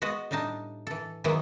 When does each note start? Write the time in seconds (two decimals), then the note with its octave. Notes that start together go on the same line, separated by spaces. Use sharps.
0.02 G#3 B3 F#4 D#5
0.31 A2 G3 D4 D#4 A5
0.87 E3 A4
1.24 D#3 E3 F#3 G#3 B3 E4